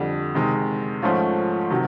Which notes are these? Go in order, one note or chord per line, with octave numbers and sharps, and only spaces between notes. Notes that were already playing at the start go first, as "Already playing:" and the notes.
Already playing: F2 D3 G3
C3 D#3 G#3
G#2 F3 A3 C#4 F4
C3 D#3 F#3